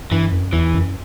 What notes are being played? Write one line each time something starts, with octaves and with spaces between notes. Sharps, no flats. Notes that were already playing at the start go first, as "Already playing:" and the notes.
G2 E3
F#2
E2 E3
F#2